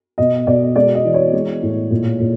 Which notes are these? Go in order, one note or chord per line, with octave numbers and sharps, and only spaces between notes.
B2 D#5
B2 D5
G#3 D5
D#5
E3
C#5
G#3
A2
A#2
A#2